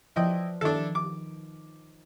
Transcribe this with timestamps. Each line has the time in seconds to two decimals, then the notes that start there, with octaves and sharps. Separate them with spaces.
0.16 F3 E4 B4 D5 D#5 G5
0.61 D#3 D4 E4 A4
0.95 D6